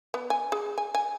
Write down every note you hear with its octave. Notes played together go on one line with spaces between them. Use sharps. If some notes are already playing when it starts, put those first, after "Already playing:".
B3
G#5
G#4
G#5
G#5